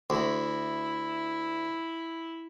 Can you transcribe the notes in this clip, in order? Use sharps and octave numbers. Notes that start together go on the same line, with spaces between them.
D2 E4